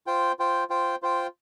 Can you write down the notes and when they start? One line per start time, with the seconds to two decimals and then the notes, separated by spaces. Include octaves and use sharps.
0.07 F4 C5 G5
0.39 F4 C5 G5
0.70 F4 C5 G5
1.02 F4 C5 G5